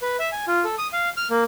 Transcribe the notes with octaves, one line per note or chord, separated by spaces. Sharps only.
B4
E5
G#5
F4
A4
D#6
F5
F6
A#3